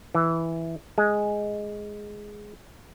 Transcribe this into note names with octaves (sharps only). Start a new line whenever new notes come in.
E3
G#3